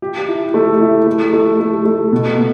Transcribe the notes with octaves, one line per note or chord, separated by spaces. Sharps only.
G4
E4
A3
E4
A3
A3
A3
A3
B2
B2